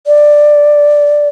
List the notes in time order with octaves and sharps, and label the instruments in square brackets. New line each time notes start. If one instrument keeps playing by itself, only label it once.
[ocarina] D5